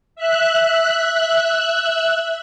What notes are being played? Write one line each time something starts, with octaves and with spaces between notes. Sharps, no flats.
E5 F#6